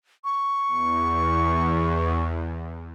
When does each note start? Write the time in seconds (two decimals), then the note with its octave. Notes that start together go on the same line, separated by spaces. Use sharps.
0.24 C#6
0.67 E2